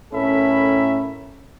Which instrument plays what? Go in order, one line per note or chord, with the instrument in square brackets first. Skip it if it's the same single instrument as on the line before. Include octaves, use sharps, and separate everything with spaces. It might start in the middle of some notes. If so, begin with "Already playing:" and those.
[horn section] A2 C#4 A4 A#4 E5 B5